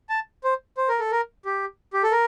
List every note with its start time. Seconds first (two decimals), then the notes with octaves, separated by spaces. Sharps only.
0.09 A5
0.44 C5
0.77 C5
0.88 A#4
0.99 A4
1.11 A#4
1.45 G4
1.93 G4
2.03 A4
2.12 A#4